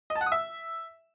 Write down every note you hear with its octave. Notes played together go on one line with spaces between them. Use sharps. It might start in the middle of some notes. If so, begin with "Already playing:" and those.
D#5
A5
F#5
D#6
E5